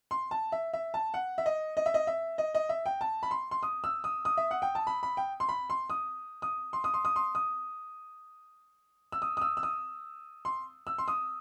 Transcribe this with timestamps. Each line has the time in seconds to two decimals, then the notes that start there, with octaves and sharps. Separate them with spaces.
0.11 C6
0.31 A5
0.52 E5
0.73 E5
0.94 A5
1.14 F#5
1.38 E5
1.46 D#5
1.77 D#5
1.86 E5
1.94 D#5
2.07 E5
2.38 D#5
2.55 D#5
2.69 E5
2.86 G5
3.01 A5
3.23 B5
3.31 C6
3.51 C6
3.63 D#6
3.84 E6
4.04 D#6
4.25 D#6
4.37 E5
4.51 F#5
4.62 G5
4.75 A5
4.87 B5
5.03 B5
5.17 G5
5.40 C6
5.49 B5
5.70 C6
5.90 D#6
6.42 D#6
6.73 C6
6.84 D#6
6.94 C6
7.05 D#6
7.16 C6
7.35 D#6
9.12 E6
9.22 D#6
9.37 D#6
9.41 E6
9.57 E6
9.63 D#6
10.45 C6
10.87 E6
10.98 C6
11.08 D#6